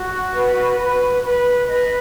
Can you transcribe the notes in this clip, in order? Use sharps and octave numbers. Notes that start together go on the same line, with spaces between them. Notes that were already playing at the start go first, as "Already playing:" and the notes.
Already playing: F#4
B4
B4
B4
B4 D#5